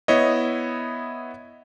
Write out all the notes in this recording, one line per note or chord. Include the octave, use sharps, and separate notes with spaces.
B3 E4 C#5 D#5